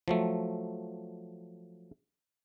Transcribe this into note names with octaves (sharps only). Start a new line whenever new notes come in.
F3 F#3 A3